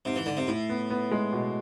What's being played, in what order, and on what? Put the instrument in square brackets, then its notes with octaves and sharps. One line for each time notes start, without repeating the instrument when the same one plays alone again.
[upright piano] G#2 [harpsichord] C3
[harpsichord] E3
[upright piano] G#2 [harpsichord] D3
[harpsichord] C3
[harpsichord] A2 [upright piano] E4
[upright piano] B3
B3
G#3
B2